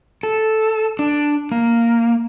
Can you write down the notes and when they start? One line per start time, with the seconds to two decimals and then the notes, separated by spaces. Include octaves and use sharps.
0.23 A4
0.99 D4
1.52 A#3